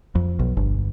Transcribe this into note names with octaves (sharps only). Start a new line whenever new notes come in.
F2
B1
G1